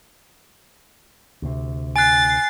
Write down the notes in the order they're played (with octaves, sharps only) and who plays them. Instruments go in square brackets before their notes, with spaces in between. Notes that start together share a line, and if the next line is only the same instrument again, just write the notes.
[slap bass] D2 C3
[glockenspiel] G#5 F#6 [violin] A6 C7